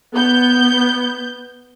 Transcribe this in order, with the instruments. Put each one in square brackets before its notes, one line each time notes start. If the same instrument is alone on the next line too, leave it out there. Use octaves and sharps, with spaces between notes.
[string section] B3 G6